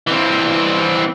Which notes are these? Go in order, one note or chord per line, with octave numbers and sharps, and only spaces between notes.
E3 C4